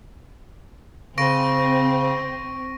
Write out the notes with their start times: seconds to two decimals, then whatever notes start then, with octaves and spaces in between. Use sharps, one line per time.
1.18 C#3 C4 C#6 A#6 D7